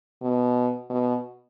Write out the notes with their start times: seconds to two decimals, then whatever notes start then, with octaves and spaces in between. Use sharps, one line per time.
0.22 B2
0.90 B2